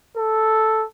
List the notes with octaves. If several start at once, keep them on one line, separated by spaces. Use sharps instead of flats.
A4